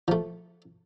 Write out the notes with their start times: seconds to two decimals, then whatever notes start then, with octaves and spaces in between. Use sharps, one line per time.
0.08 F3 A3